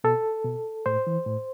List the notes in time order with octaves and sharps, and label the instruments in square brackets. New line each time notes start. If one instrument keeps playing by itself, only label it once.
[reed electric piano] B2 A4
B2
A2 C5
E3
A2